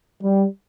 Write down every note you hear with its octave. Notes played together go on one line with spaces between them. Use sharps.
G3